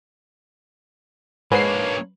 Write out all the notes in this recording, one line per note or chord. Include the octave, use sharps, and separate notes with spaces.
G#2 A#3 D4 B4 C#5 C7